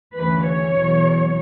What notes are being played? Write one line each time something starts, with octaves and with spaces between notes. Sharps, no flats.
D2 C#3 E3 B4
C#5
E2 B2 F#3